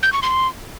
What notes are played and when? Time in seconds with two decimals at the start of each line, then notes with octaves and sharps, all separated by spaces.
0.03 G6
0.13 C#6
0.22 C6